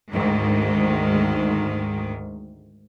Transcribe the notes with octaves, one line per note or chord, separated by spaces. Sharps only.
D2 G#2 D#3